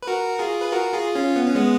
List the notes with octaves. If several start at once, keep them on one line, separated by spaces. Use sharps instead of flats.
B4
F#4 A#4
F4 G#4
B4
F#4 A#4
F4 G#4
C#4 F4
B3
C#4
G#3 B3